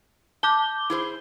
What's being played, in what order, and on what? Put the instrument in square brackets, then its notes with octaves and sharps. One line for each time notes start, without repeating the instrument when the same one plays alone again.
[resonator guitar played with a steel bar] A5 [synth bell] D6 G6 G7
[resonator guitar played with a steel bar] E4 G#4 C5